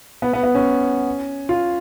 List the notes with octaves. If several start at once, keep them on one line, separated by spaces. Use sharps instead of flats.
B3
B3
B3
C#4
F4